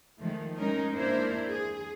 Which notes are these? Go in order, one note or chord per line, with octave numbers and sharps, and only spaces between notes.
D#3 F3 G#3 A3
G#3 C#4 D#4 A#4
A#3 D4 E4 A#4 C5
G#4